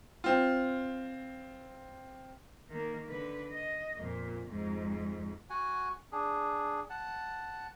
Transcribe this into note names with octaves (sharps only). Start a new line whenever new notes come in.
C4 F4
D#3 A#3
D3 B4
D#5
F2 A#2
F2 G#2
F#4 F#5 G#5
D4 G#4
F#5 A5